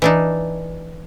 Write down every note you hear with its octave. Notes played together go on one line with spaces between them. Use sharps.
E3 D4 D#4